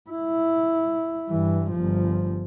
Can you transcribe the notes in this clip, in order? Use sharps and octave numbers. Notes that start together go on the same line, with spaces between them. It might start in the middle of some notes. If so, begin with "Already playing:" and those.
E4
G2 E3
G1 F3